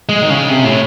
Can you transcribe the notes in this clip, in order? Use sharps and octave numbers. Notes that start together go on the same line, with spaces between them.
G#3
D#3
C#3
C3
A2